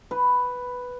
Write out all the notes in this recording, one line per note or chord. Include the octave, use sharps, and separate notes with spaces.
B4